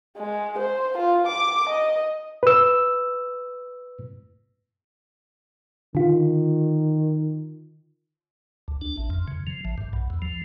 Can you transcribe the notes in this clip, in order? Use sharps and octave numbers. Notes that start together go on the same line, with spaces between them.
G#3
C5
F4
D6
D#5
B4 E6
D3 D#3 F4
D2
D4
A1
F2
C#3
F3
A1
G2
B1
E2
F3